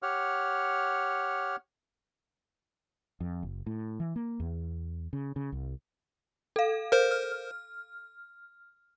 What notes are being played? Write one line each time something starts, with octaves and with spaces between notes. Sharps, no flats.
G4 C#5 F#5 F6
F2
F#1
A2
E3
A#3
E2
C#3
C#3
C2
A4 F5
A#4 C5
F6